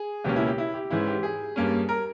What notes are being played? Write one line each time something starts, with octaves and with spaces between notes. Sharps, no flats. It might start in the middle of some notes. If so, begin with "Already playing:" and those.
Already playing: G#4
C#2 B2 A#3 C#4 G4
E4
G4
E4
G4
G#2 E3 G#3 C#4 E4
G4
G#4
G2 G3 A#3 C#4
A#4